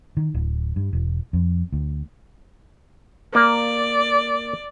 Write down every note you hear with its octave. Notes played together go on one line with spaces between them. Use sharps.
D#3
D1
G2
E1
F2
D2
A#3 D5